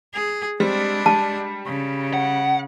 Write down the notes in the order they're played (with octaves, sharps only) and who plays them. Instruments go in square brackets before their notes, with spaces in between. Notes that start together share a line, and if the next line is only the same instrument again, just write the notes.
[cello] G#4
[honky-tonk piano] G3 C4 [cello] G#3 D4
[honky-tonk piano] G3 [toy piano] A5
[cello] C#3
[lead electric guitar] F#5